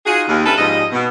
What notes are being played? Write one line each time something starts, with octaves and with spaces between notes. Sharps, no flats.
D#4 F4 F#4 G#4
D#2
C#4 D4 E4 G4 A4 B4
G#2 F3 G3 D#5
B2